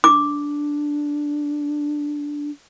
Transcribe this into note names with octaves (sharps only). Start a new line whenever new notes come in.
D4 D6